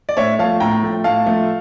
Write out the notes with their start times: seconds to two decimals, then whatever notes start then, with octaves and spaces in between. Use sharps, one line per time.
0.09 D5
0.17 A2 C#5 E5
0.39 F3 A3 F5 A5
0.60 A2 G5 A#5
0.83 F3 A3
1.04 A2 F5 A5
1.26 F3 A3